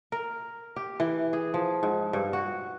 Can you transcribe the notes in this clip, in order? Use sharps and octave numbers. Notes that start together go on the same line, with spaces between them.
A#4
G4
E3
G#4
F3
G#2
G2
F#4